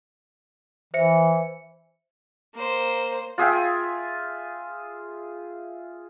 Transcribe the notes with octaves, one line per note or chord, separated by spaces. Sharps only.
E3 C5 E5 C#7
A#3 C5
F4 G#4 E5 G5